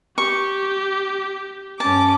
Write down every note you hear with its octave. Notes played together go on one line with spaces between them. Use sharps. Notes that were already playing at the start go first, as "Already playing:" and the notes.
G4 C#6
G2 C#4 A5 D6